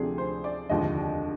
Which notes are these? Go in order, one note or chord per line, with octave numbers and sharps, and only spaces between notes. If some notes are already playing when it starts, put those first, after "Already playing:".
Already playing: D2 C3 F3 G#4 D5
C5
D5
F1 D#2 D3 F3 G#3 D#5